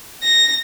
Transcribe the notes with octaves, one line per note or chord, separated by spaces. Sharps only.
A#6